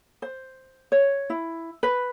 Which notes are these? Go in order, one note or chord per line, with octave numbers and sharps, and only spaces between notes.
C5
C#5
E4
B4